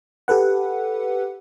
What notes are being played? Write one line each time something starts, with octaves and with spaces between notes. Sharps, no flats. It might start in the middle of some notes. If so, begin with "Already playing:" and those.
G4 A4 B4 F#5